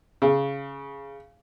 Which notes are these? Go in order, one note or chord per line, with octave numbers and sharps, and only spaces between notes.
C#3